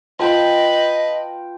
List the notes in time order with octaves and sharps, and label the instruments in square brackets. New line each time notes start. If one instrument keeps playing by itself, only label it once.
[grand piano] F4 [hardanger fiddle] B4 [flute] D#5 [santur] G5 A5 C6